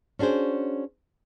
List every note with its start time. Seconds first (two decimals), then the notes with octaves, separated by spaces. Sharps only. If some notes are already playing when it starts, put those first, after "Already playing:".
0.19 C#4 D4 F#4 G#4 C5